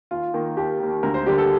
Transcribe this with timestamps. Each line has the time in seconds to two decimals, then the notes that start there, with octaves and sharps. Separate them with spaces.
0.11 D#2 F4
0.34 D#3 A#3
0.57 D#2 G4
0.80 D#3 A#3
1.03 D2 A#4
1.14 C5
1.26 D3 G3 A#3 G4
1.38 A4